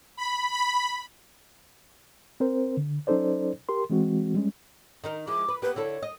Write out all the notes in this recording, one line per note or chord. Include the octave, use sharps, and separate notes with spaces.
B5
B5
C4 A#4 C5
D3
F#3 C#4 D#4 A4 C5 D5
G4 A#4 C6
E3 G#3 C4 F#4
G3 G#3 C#4
D#3 D#4 A#4
F3 G#3 E4 D6
B4
A#3 B3 G4 B4
D3 E4 A4 C#5
D#5